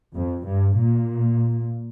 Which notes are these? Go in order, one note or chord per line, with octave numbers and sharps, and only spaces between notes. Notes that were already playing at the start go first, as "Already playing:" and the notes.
F2
G2
A#2